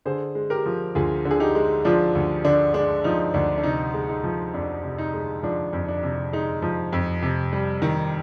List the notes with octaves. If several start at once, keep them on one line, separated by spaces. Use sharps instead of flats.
D3 G#4 C5
G#3
G4 A#4
F3
D2 F4 G#4
D3
G#4
D#4 G4
G#3
F3 D4 F4
D2
D3 D4
G#3 D4
F3 D#4
D2 D4
D4
C3 D#4
G#3
D#4
F3
F2 D4
C3
D#4
G#3
F3 D4
F2
D4
C3
G#3 D#4
F3
F2
C3
G3
D#3